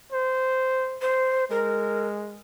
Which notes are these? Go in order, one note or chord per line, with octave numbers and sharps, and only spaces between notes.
C5
C5
G#3 A#4